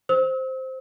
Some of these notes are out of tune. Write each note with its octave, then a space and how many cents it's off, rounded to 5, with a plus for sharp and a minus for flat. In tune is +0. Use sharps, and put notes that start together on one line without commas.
C5 +0 E6 -40